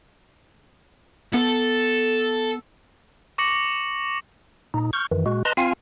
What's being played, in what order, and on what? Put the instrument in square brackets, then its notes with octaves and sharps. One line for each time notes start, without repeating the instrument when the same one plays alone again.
[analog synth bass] B3 [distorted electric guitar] A4
[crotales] C#6 D6 A#6 C#7 F#7
[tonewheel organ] A#2 D#4
C#6 F6 G6
F#2 D#3 E3
A#2 G#3 F#4
B4 D#5 A5 A#5 C6
C4 F4 F5 G#5